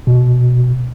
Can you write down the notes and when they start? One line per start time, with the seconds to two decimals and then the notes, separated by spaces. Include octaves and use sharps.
0.07 B2